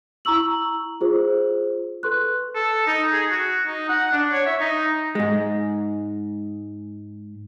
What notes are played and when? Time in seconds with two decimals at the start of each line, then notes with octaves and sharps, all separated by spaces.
0.25 E4 A#5 C#6 E6 F#7
1.01 F4 G#4 C5
2.03 A4 B4 C6 C#6 F#6
2.55 A4
2.87 D#4
3.13 G#4
3.30 F#4
3.66 D#4
3.89 F#5
4.12 D4
4.32 C#5
4.46 E5
4.60 D#4
5.15 G#2 G#3